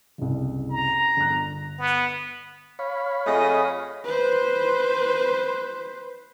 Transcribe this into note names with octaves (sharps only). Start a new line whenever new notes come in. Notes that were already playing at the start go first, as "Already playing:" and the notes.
F#1 C2
A#5
G1 F#6
B3
C#5 F5 B5
F2 A3 G#4 D#5
B4 C5